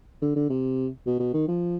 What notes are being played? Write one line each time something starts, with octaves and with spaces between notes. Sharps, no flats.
D3
D3
C3
B2
B2
D#3
F3